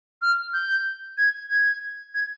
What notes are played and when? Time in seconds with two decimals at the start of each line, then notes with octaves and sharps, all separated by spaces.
0.22 F6
0.53 G6
1.17 G#6
1.50 G#6
2.14 G#6